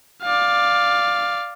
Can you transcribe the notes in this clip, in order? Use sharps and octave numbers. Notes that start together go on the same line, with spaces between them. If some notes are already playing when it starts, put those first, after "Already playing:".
D5 F5